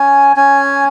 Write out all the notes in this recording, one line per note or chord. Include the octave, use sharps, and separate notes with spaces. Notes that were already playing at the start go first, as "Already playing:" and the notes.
Already playing: C#4 G#5
C#4 G#5